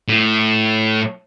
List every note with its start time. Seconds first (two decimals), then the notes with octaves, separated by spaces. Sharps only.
0.08 A2